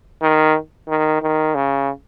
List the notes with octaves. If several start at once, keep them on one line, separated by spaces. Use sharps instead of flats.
D#3
D#3
D#3
C#3